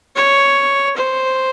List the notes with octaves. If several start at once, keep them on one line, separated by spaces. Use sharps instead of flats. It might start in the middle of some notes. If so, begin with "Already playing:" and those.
C#5
C5